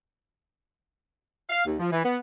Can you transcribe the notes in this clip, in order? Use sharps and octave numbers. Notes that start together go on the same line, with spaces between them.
F5
D#2
F3
E3
B3